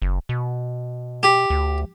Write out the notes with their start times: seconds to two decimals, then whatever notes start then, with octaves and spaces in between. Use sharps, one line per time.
0.02 F#1
0.29 B2
1.23 G4
1.50 D2